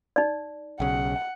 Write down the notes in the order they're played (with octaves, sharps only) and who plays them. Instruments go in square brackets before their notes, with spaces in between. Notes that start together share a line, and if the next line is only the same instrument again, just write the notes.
[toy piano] D#4 D5
[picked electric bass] B1 C#3 [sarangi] F#5